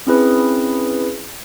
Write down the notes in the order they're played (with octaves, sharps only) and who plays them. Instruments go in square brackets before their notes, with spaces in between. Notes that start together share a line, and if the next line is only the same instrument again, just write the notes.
[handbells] C4 C#4 E4 G#4 B4